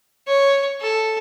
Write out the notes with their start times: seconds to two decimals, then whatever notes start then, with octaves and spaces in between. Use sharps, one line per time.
0.27 C#5
0.80 A4